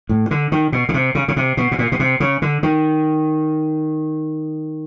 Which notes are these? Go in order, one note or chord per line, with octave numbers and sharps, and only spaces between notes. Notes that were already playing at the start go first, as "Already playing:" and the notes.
A2
D3
D#3
B2
C#3
C3
C#3
C#3
C3
B2
B2
A#2
B2
C3
C#3
D3
D#3